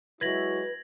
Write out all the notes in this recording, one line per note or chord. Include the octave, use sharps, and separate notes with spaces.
F#3 G#3 E4 F#4 B4 G#6 A#6 F#7